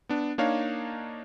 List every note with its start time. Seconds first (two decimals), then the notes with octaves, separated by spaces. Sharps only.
0.09 B3 D4
0.38 A#3 D4 D#4 C#5 F5